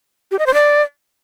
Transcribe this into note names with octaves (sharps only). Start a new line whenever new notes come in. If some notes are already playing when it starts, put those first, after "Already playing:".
G4
D#5
C5
D5